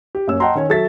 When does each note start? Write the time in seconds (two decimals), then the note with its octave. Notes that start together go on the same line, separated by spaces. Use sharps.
0.15 G4
0.27 F#2 A#3 C#5 E6
0.40 D#5 F#5 G5 A5 A#5 C6
0.55 D#3 C#4 C#5
0.69 F#3 A4 E5 A6 B6